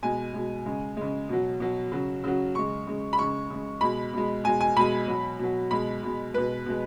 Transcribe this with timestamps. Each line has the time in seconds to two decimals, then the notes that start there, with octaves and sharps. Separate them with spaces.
0.03 B2 G#3 G#5
0.34 B2 G#3
0.66 C#3 G#3
0.97 C#3 G#3
1.29 B2 F#3
1.60 B2 F#3
1.92 C#3 F#3
2.24 C#3 F#3
2.55 C#3 G#3 C#6
2.87 C#3 G#3
3.13 B5
3.18 C#3 G#3 C#6
3.50 C#3 G#3
3.81 B2 G#3 B5
4.14 B2 G#3
4.44 B2 G#3 G#5
4.61 G#5
4.76 B2 G#3 B5
5.08 B2 F#3
5.39 B2 F#3
5.71 B2 G#3 B5
6.03 B2 G#3
6.34 B2 G#3 B4
6.66 B2 G#3